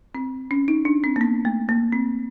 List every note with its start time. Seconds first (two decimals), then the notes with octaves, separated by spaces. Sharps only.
0.15 C4
0.51 C#4
0.68 D#4
0.85 D4
1.04 C4
1.16 A#3
1.21 B3
1.45 A3
1.69 A#3
1.92 C4